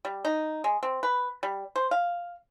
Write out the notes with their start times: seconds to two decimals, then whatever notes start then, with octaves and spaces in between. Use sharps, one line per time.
0.05 G3
0.25 D#4
0.64 G#3
0.83 C4
1.03 B4
1.43 G3
1.76 C5
1.91 F5